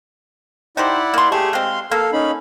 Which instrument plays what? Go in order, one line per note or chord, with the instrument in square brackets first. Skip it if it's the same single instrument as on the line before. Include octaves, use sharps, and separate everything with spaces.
[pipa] D#4 G4 C5 [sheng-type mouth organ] E4 D5 F#5
[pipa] A#3 C6
[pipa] A3 [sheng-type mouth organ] G4 G#4
[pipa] G#3 C4 [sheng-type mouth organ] F5 C6
[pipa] A#3 [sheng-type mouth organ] A4 F5
[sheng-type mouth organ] C#4 D#4 B5